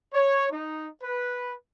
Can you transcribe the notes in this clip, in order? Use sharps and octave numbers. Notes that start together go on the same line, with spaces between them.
C#5
D#4
B4